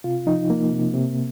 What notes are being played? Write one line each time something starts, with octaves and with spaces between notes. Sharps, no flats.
C3 F4
F3 D#4
F3 A#3
C3
C3